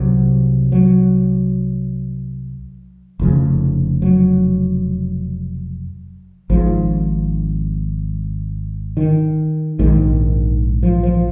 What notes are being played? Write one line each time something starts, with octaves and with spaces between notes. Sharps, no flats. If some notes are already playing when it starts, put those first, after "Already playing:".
Already playing: C2 C3 F#3
F#3
F1 F2 C#3
F#3
G#1 G#2 F3
D#3
A#1 G#2 D#3
F3
F3